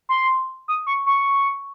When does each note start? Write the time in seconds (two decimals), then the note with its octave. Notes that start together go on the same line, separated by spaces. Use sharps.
0.09 C6
0.68 D#6
0.87 C#6
1.06 C#6